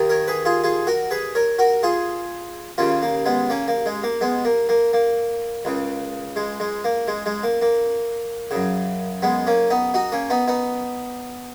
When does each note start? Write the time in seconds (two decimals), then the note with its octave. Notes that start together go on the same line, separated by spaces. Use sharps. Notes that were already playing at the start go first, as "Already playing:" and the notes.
Already playing: D#2 D#3
0.10 A#4 C#5
0.28 G#4 B4
0.45 F4 G#4
0.64 F4 G#4
0.87 F#4 A#4
1.11 G#4 B4
1.35 A#4 C#5
1.59 F#4 A#4
1.83 F4 G#4
2.78 D#2 C#3 C#4 F4
3.02 A#3
3.25 G#3 B3
3.50 A#3 C#4
3.68 A#3
3.86 G#3
4.03 A#3
4.21 G#3 B3
4.45 A#3
4.69 A#3
4.93 A#3
5.65 C#2 C#3
6.36 G#3
6.60 G#3
6.84 A#3
7.08 G#3
7.26 G#3
7.43 A#3
7.62 A#3
8.51 F#2 C#3
9.22 G#3 B3
9.47 A#3 C#4
9.70 B3 D#4
9.94 D#4 F#4
10.12 A#3 C#4
10.30 B3 D#4
10.48 B3 D#4